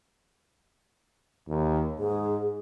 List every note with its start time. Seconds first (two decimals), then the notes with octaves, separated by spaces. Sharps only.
1.48 D#2
1.99 G#2 G#4